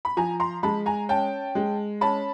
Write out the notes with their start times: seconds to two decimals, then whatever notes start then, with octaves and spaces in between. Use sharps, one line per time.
0.05 B5
0.17 F3 G#5 A#5
0.40 A#5 C6
0.63 G#3 A5 B5
0.86 G#5 A#5
1.09 C#4 G5 A5
1.55 G#3
2.01 C#4 A5 B5